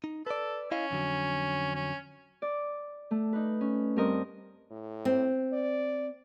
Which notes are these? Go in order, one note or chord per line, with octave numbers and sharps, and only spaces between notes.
D#4
A4 B4 D5
C#4 E4 D#5 F5
F2 D3 F#3
C#4
D5
A3
D#4 B4
C#4
G2 C4 A#4 D#5
A2
C4
D5